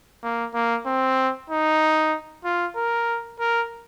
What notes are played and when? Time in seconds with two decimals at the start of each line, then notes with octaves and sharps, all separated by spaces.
0.23 A#3
0.54 A#3
0.86 C4
1.50 D#4
2.44 F4
2.76 A#4
3.39 A#4